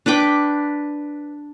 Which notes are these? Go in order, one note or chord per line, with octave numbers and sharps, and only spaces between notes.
D4 B4 G5 D6